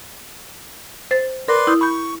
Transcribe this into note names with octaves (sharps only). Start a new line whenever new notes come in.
C5 A6
A#4 B4 D5 C6
E4 D#6 G6
B5 C#6 G6